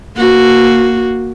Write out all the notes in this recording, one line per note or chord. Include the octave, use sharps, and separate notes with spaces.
A#3 F#4